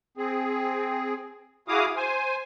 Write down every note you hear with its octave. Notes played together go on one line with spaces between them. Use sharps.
C4 G#4
E4 F#4 G#4 F5 D6 D#6
C5 G#5